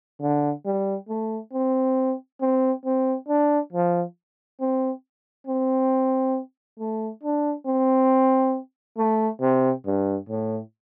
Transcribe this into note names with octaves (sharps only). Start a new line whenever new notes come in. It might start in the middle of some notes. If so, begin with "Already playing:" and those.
D3
G3
A3
C4
C4
C4
D4
F3
C4
C4
A3
D4
C4
A3
C3
G2
A2